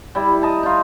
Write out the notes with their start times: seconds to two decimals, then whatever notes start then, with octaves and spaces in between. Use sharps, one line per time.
0.15 G3 E4
0.42 D#5 A5 A#5
0.63 D#4 F4